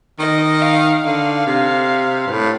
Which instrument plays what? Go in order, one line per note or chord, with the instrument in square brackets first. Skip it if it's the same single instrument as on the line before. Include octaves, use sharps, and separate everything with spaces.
[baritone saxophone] D#3 [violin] D#5
[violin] F5
[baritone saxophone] D3 [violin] F5
[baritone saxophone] C3
G2
A2